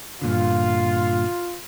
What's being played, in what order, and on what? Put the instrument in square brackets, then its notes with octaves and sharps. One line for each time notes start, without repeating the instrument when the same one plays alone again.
[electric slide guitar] G2 A#2 D3 [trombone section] F4